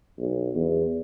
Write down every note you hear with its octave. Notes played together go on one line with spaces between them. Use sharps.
B1
E2